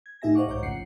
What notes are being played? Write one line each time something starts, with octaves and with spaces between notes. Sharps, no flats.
G#6
A2 D#4 G4 E5 G#5 A#6
C5 D#5 F5 F#5 C#6 D6
B1 G#2 C#5 A#5 D6 G6
A1 F2 C#3 F#5 C7 C#7